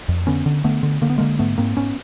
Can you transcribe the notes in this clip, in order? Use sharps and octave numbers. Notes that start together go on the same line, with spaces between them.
F2
D3 B3 C#4
D3
D3 A3 B3
D3
D3 A#3
B3
D3 G#3 A#3
G#2 A3 B3
G#2 A#3 C4
G#2 B3 C#4